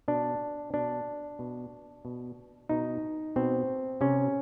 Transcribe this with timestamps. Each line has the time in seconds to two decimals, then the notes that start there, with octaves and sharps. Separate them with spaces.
0.08 B2 D4
0.74 B2 D4
1.39 B2
2.05 B2
2.69 B2 D#4
3.36 B2 C4
4.01 C3 C#4